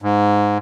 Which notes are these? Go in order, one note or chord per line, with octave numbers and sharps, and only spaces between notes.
G#2